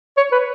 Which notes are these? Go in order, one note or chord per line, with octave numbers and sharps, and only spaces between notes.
C#5
B4